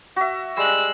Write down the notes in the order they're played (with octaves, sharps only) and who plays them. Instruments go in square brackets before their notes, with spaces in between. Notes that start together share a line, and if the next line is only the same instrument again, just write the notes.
[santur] F#4 E5
[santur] G3 G#3 [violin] E6 F#6